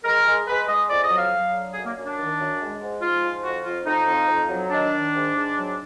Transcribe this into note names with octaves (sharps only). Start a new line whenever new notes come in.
G#3 A#4
G#3
G#3 B4
G#3 D#5
F2 D5
D#5
F#3
F5
F#3
D3
F#2 G#4
A#3
F#2
D4
D#3
F#2
G#3
G#2
G#2 F4
F3
F2 F#4
F2 F4
F2 D#4
F2
F2
F#3
D#3 D4
D#3
G#2
G#2
F#3